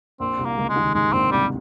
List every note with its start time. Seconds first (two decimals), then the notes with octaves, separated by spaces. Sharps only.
0.20 A#1 A#2 C4
0.38 C2 C3
0.46 A#3
0.57 C#2 C#3
0.69 G#3
0.76 D#2 D#3
0.94 G#2 G#3
1.13 A#1 A#2 C4
1.32 C2 C3 G3